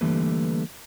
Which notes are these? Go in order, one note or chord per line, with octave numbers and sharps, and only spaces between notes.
D3 E3 G3 A3 A#3 B4